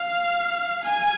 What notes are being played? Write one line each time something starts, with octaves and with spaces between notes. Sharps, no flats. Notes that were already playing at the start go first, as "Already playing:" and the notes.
Already playing: F5
G#5